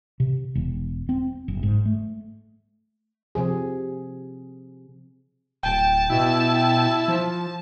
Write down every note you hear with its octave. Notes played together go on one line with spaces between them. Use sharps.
C3
E1
C4
F#1
G#2
A3
C3 F3 G#4
D1 G5 A5
B2 E4
F3